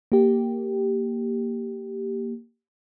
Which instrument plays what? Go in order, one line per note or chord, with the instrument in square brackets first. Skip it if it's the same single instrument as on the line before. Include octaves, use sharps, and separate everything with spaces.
[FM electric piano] A#3 G4